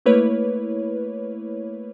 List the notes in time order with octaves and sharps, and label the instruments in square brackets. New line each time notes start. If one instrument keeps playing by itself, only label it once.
[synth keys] A3 A#3 E4 B4 C#5